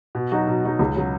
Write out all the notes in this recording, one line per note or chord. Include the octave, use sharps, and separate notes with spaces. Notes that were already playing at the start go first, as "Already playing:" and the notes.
B2
F#3 D#4 F#4
B2
F#3 D#4 F#4
C#2
C#3 F#3